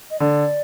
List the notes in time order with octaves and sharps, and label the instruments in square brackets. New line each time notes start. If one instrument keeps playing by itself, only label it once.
[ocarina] D#5
[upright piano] D3 [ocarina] D5